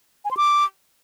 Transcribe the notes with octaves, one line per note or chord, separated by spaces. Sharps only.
G#5
C6
D6